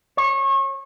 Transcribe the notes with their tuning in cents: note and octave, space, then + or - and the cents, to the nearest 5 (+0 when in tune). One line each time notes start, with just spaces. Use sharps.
C#5 -30